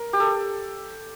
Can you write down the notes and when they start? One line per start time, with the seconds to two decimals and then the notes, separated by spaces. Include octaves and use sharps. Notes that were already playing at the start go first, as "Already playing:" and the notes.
Already playing: A#4
0.13 G4
0.20 A4